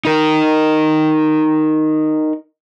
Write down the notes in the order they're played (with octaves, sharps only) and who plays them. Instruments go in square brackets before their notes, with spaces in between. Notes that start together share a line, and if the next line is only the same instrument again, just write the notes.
[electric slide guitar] D#4 A#4